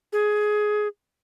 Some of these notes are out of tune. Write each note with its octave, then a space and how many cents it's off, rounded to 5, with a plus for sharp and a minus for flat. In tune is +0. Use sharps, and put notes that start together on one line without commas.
G#4 +15